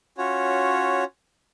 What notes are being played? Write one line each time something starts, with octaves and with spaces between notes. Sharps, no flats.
C#4 F4 F#4 C#5